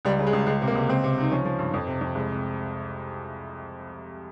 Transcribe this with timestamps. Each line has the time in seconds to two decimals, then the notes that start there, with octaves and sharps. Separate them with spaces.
0.05 C#2 G3
0.19 C#3
0.27 G#3
0.33 C#2
0.46 C#2 G#3
0.62 C3
0.67 A#3
0.75 C#2
0.89 C#2 C4
1.04 C3
1.18 C#2 D#4
1.31 F3 C#4
1.45 F3
1.59 G2
1.73 F2
1.87 C3
2.01 F2
2.15 C2 G#3
2.29 C3